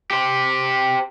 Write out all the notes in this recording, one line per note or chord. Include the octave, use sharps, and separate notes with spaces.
G4 C5